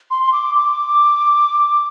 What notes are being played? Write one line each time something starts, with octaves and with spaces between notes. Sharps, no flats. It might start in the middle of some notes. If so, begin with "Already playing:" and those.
C6
C6
D6
D6